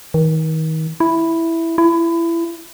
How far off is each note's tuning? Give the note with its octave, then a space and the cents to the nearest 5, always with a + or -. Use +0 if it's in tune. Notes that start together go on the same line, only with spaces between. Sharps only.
D#3 +35
E4 +0
E4 +25